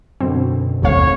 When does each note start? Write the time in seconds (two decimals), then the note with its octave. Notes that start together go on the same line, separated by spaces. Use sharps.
0.21 F#2 B2 D3 C4
0.82 G1 D#2 A3 C4 C#5 F5